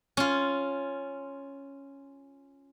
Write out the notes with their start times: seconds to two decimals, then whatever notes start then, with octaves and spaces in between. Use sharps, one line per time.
0.17 C#4 F4